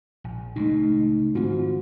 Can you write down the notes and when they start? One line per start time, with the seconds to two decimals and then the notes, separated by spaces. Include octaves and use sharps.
0.24 A#1
0.56 C#2 A#2 A3 D#4
1.35 G#2 D#3 F3 C4 F4 F#4